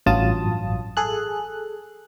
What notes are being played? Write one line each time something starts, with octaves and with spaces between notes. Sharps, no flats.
A1 G2 F#3 F4 A5 D#6
G#4 A4 F#6